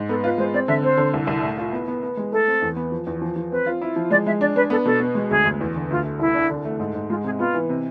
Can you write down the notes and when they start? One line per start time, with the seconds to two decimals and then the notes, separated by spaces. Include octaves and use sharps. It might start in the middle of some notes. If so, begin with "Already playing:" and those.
Already playing: G#2
0.09 B3 A4
0.24 F4 B4
0.38 G#3 C5
0.54 C4 D5
0.68 D3 E5
0.83 C4 C5
0.97 D3
1.14 C2
1.27 C2
1.43 A2
1.58 F4
1.72 B3
1.88 B3
2.03 B3
2.17 G#3
2.32 A3 A4
2.48 C4
2.62 E2
2.76 B3
2.92 F3
3.07 E2
3.22 F3
3.36 F3
3.51 C4 B4
3.66 F4
3.82 E4
3.96 F3
4.10 G#3 D5
4.26 G#3 E5
4.40 D4 D5
4.55 D4 B4
4.70 B3 A4
4.85 B2 A4
5.00 B3
5.15 G#3
5.30 D2 G#4
5.45 D2
5.61 E2
5.76 D3
5.90 D2 F4
6.04 A3
6.20 C2 E4
6.34 D4
6.50 D3
6.65 A3
6.80 G#2
6.95 G#2
7.09 G#3 F4
7.24 C3 G#4
7.38 B3 F4
7.54 E3
7.69 C3